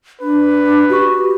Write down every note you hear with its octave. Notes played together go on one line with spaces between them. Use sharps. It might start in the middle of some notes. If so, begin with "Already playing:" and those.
D4 B4
F#4 G4 C#6